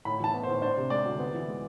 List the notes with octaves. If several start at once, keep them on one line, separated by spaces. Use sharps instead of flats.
A2 B5
E3 A5
B3
C5
A2
D4 C5
C3
G#3 D5
D2
B3
E3
G#3